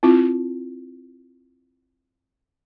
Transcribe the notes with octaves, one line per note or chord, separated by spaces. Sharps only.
C4 E4 F4